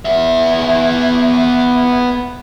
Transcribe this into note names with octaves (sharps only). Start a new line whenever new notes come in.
B3 E5